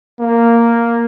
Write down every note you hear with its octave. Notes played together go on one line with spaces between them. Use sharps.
A#3